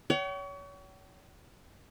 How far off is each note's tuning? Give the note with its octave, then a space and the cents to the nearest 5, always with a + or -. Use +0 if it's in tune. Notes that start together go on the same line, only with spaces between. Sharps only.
C#5 +35 G5 -45